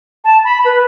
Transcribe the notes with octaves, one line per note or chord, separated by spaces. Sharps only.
A5
B5
B4